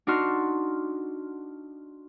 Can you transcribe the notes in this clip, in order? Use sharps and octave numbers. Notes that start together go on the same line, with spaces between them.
D4 D#4 F#4 C6 F6 E7